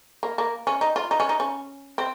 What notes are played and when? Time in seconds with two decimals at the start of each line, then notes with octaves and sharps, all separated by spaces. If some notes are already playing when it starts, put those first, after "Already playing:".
0.23 A#3
0.38 A#3
0.67 C#4
0.81 D#4
0.96 F4
1.11 D#4
1.20 C#4
1.29 D#4
1.40 C#4
1.98 C4